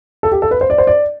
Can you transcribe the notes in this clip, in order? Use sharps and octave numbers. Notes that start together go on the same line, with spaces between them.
A4
G4
A4
B4
C5
D5
C5
D5